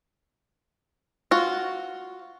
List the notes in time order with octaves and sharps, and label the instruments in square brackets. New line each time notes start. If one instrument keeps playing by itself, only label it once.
[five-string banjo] F4 F#4